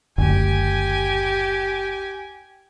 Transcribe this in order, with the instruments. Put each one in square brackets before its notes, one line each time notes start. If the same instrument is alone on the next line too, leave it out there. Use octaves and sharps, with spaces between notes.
[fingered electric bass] F#1 D2 [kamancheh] G4 G#5